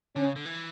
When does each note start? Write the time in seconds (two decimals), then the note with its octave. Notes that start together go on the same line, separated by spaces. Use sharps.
0.16 D3 C#4
0.25 C#3
0.36 D3
0.45 E3